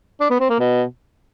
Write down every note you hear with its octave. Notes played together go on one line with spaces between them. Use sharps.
D4
B3
C4
A#3
B2